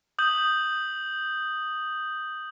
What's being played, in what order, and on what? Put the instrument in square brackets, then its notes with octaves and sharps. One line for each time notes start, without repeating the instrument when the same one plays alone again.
[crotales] D#6 G6 F#7